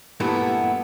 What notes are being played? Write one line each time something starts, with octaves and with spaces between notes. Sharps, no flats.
G2 A#2 E3 A3 B3 E4